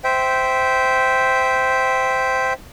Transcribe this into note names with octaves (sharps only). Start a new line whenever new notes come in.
C5 E5 G5